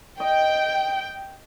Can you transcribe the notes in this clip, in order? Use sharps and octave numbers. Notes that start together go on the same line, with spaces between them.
D#5 G5